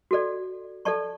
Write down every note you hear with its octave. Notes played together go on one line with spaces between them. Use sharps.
F#4 A4 D5
A4 D5 A5 C#6